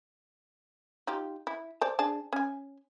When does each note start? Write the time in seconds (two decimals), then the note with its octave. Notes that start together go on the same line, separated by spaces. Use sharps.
1.07 D#4 F4 G4
1.47 E4
1.81 C5 D5 A5
1.99 D4 G#4 A5
2.33 C#4 G#5